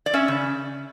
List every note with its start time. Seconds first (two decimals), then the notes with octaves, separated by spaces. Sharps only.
0.06 D5
0.14 C#4 E5
0.28 C#3